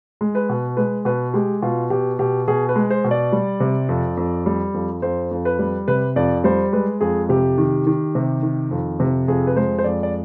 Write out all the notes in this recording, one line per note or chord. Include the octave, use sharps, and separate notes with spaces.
G#3
B4
B2
G#3 B4
B2 B4
G#3 G4
B2 F4
B2 G4
B2 G4
B2 G#4
B4
G#3
C5
B2
D5
G3
C3
F2
F2
G3
F2
F2 C5
F2
B4
G3
C3 B4
F2 D5
G3 C5
G#3 B4
F2 G#4
C3 G4
D#3
D#3
C3
D#3
F2
C3
F2 G#4
B4
G#3 C5
C5
F2 D5
D5